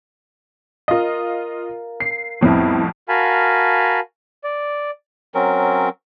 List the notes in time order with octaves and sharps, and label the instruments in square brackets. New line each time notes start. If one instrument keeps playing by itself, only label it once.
[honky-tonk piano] F4 D#5 [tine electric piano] A#4 F5
[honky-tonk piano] C7
[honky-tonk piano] C2 F2 A2 [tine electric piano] B3 C4 E4
[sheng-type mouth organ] F#4 A#4 F5 G#5 A5 B5
D5
[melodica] F#3 C4 C#4 A#4